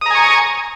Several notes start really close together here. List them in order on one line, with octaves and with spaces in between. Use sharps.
D#6 A#5 G#5 C#6